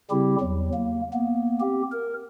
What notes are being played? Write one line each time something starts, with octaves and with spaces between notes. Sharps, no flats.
C#3 G3 C4 E4 G4
E2 F#3
A#3
A#3 B3
C4 G4
A#4